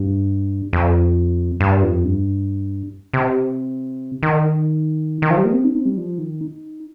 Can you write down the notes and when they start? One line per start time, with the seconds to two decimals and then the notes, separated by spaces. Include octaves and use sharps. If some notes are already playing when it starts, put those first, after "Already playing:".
Already playing: G2
0.73 F2
1.60 G2
1.83 F2
2.04 G2
3.13 C3
4.23 D#3
5.22 D#3
5.30 F3
5.37 G3
5.45 A#3
5.53 C4
5.64 D#4
5.75 C4
5.85 G3
5.97 F3
6.18 D#3
6.41 D#4